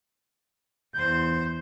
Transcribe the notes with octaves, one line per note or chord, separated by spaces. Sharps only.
E2 C5 G6